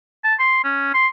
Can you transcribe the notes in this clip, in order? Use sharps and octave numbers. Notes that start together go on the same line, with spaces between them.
A5
C6
C#4
C6